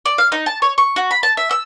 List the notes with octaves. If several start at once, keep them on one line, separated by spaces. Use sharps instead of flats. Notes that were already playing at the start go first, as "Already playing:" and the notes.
D5
F5
D#4
A5
C#5
C#6
F#4
B5
A5
E5
E6